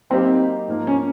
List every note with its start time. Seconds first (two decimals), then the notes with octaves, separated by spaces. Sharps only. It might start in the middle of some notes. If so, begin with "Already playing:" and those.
0.10 F#3 A#3 C4 D#4 G4
0.68 G#2 F3 A#3
0.87 C#4